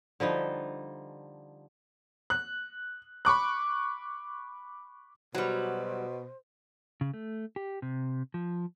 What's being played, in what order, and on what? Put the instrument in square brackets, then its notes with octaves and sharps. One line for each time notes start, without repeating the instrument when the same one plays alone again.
[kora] D3 F3 G3 D#4
[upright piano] F#6
B5 C#6 D6 F#6
[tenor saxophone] B2 [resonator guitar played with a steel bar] F#3 G3 [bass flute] C5
[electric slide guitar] C#3
A3
G4
C3
F3